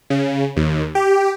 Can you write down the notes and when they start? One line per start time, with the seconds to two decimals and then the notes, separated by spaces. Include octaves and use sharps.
0.10 C#3
0.56 D#2
0.95 G4